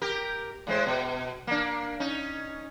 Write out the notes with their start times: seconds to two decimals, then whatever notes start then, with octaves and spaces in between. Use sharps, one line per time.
0.02 G4 A#4
0.67 A2 G#3 C5
0.86 B2
1.47 A#3 D4
2.00 C#4 D#4